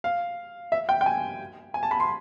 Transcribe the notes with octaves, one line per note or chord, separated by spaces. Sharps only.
F5
E5
G5
G5
G#5
G#5
A5
B5
C6